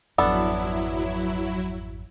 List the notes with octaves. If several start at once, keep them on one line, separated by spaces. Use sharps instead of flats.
G#1 F2 F#3 B3 D4 E4 A4